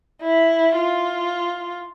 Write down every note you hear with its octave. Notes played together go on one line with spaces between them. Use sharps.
E4
F4